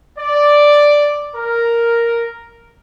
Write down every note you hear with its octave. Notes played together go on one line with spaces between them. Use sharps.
D5
A#4